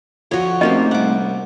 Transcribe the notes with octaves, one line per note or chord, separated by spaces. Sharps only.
F2 D3 F#4 C#5
A2 C3 D#3 A#3 C#4 C5 D#5
C2 F#5 D6